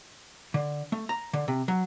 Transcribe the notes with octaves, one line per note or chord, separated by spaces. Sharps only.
D3
A3
A#5
D3
C3
F#3